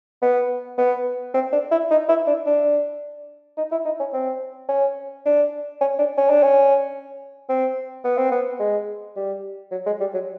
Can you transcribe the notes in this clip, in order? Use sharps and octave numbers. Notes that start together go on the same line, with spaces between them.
B3
B3
C4
D4
E4
D#4
E4
D4
D4
D#4
E4
D#4
C#4
C4
C#4
D4
C#4
D4
C#4
D4
C#4
C4
B3
C4
B3
G#3
G3
F#3
G#3
G3
F#3